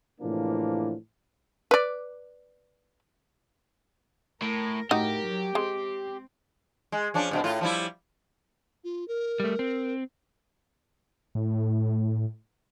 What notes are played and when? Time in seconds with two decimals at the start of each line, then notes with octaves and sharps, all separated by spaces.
0.21 A2 C3 E3 F3 A#3 D4
1.71 B4 D5
4.42 A2 A#4
4.91 A2 D#4 F#4 G4 A#4
5.26 F#3
5.55 G#3 C4
6.92 G#3
7.14 F3 C#4 D4
7.31 G2 B2 C4
7.44 A2 F4
7.61 F3 G3 E4
8.84 F4
9.08 A#4
9.40 G3 A3
9.59 C4
11.35 A2